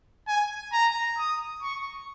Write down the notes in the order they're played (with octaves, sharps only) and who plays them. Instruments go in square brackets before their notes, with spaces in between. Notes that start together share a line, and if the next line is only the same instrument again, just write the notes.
[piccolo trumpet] G#5
A#5
D#6
C#6